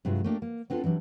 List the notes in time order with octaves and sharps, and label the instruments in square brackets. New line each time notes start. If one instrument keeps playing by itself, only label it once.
[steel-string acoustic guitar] G2 C3 F#3 G#3 F4
A3 A#3 D4 G4
A#3
B3 C4 D4 F4 A4
E3 F#3 G3 D4